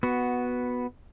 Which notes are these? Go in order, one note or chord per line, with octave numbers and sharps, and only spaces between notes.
B3 F#4